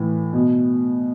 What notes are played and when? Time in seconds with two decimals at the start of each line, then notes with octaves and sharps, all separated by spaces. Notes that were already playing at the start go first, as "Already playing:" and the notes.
Already playing: A2 E3
0.33 B2